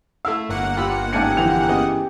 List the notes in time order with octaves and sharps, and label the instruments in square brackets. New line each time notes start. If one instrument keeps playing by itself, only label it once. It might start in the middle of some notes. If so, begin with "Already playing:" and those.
[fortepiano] A3 E4 F5 [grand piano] E6
[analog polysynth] G1 A#3 F#5
[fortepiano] F4 B5 E6 [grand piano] G4
[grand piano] G#2 A5 C#7 [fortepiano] C#4 G#5 [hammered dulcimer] G4 G#4
[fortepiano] F2 D3 [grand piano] E3 F7
[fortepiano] C#3 B3 D#5